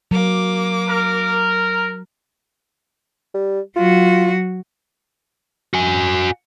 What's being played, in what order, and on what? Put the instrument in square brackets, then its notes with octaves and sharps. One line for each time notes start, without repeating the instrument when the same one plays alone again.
[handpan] F#3 [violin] A#3 D6
[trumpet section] A#4
[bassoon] G3
[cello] F#3 F#4 [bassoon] F4
[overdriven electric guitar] F#4 G#5